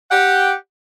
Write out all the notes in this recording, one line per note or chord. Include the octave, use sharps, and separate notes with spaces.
G4 F#5